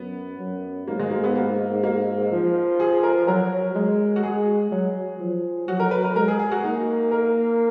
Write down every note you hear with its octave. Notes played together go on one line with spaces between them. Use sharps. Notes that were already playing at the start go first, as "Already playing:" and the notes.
Already playing: F#2 B3
F#2
G#2 A#3
G#3
A#3
B3
A#3
A#3
F3
G#4
A#4
F#3 A#4
G#3
F#4
G#3 G#4
F#3
F3
F#3 F#4
A#4
B4
A#4
G#3 A#4
G#4
G#4
F#4
A#3 D#4
A#4